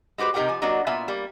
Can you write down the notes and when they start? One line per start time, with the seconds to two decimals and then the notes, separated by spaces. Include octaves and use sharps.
0.18 G#3 F#4 G4 B4 C5
0.34 C3 D#4 G4 A#4 F#5 G5
0.48 F3 G#5
0.62 F#3 A#3 D4 F#4 D#5
0.87 A#2 B3 F4 E5 G#5
1.08 G3 A#3